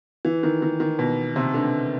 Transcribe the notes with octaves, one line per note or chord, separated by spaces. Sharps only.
E3
D#3
D#3
D#3
B2
C3
D3